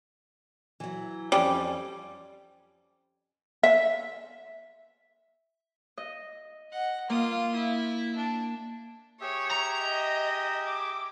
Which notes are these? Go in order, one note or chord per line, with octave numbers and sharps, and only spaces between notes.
E3 F#3
F2 G3 C#4 G5
E5
D#5
D#5 F#5
A#3 F4 D#6
E4
D4
G4 G#4 C#5 E5
A#5
D#5
D6